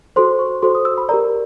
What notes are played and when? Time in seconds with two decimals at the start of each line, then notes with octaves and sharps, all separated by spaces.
0.16 F#4 A4 C5 C6
0.39 C#6
0.62 F#4 A4 C5 C6
0.75 D#6
0.85 E6
0.98 B5
1.09 G4 A#4 D5 A#5